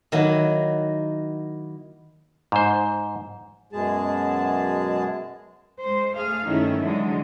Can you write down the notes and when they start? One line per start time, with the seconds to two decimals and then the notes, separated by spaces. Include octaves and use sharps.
0.12 D#3 F#3 A#3 E4
2.52 G#2 C5
3.73 F#2 B2 G#3 G#4 A5
5.81 G#3 C5
6.16 A3 G#4 F5
6.45 G2 D#3 A3 C#4 D#4 E4
6.81 D3 E3 F#3 G#3